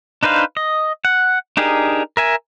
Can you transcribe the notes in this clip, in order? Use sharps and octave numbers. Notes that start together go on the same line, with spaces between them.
D4 D#4 B4 C5 F5
D#5
F#5
D4 D#4 G4 G#4 A#4
A#4 E5 G#5